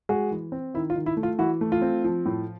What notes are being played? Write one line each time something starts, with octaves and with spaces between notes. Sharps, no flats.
G#3 F#4 G#4
E3
C4
D#3 E4
F4
D#3
E4
A3
F4
E3 E4 F#4
A3
F4
C4
F3
A2